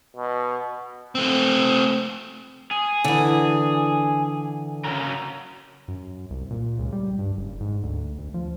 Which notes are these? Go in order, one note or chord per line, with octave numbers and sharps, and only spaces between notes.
B2
A3 C4
G#4
D3 E3
C#3 F#3 A#4
F#2
C2
A#2
C#2
G3
G2
F#1
G#2
D2
D2
F3